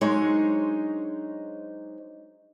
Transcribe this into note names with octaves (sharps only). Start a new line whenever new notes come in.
F#3 G#3 D4 D#4 C5 C#5